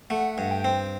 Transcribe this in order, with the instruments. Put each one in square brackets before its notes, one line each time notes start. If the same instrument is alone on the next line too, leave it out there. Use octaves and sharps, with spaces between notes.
[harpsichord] A3 [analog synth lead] F#5
[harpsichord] G2
[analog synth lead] G5
[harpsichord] C4